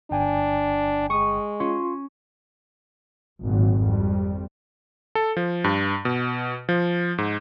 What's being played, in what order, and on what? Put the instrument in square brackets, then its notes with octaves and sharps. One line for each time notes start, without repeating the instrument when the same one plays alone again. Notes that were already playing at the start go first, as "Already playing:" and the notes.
[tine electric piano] G1 G5 G#5 [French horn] D4
[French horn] G#3 [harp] C#6 D#6
[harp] C#4 [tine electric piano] F4 C6
[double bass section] G#1 A#2 F#3
F2 G3
[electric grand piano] A4
F3
G2
B2
F3
G#2